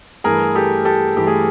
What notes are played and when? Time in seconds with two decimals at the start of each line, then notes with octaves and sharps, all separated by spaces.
0.24 G2 E3 A3 G#4 A#4
0.55 G4 A4
0.85 G4 A4
1.17 G2 E3 A3 G4
1.27 G#4